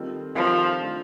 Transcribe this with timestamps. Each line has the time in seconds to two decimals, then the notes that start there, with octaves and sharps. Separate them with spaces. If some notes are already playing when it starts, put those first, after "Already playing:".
Already playing: D#3 G3 C4 F4 A4
0.35 D#3 F3 G3 C4 F4 A4
0.80 F3 A3 D4